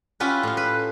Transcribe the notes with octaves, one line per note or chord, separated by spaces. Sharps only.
C#4 E4 F4 G4 B4
A2 F5
B4